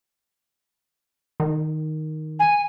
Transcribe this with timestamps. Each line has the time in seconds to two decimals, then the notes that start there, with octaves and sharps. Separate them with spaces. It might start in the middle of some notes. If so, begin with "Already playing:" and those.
1.40 D#3
2.39 G#5